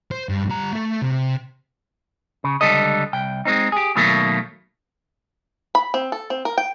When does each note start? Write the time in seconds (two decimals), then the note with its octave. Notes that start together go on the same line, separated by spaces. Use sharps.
0.11 C5
0.29 G2
0.50 G3 A#5
0.73 A3 A4
1.02 C3
2.44 C#3
2.61 C#2 G#2 D3 G3 A4 D#5
3.13 C2 G5
3.45 G#3 A#3 C4 D#4
3.72 G4 G#4
3.96 B2 D#3 F#3 A3 A#3
5.75 B5
5.94 C4
6.12 A4
6.30 C4
6.45 A#4
6.58 G5